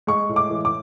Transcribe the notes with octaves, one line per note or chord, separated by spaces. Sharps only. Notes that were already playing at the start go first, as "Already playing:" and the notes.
G#3 C#6
A2
D6
E3
D6